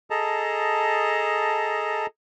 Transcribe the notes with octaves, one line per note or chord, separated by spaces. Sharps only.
G#4 A4 D#5 A5 A#5